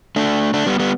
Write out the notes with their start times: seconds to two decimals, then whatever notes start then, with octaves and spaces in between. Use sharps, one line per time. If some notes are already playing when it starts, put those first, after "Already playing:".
0.16 A3 D4
0.54 A3 D4
0.66 G3 B3
0.79 G3 B3